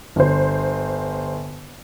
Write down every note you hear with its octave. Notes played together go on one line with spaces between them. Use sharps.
G1 C5